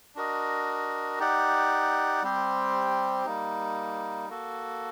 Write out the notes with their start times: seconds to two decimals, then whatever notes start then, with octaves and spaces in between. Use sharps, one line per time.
0.15 D4 F#4 A#4 D#5
1.19 D#4 G4 D5 F#5
2.22 G3 C4 G4 C5
3.26 G3 A#3 D#4
4.30 A#3 F#4 A4